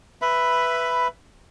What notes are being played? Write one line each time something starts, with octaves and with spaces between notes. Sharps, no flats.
B4 E5 B5